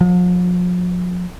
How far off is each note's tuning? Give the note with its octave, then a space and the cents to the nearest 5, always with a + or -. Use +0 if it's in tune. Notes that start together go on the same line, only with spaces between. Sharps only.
F3 +45